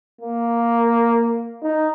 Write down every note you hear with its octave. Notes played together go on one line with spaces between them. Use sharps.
A#3
D#4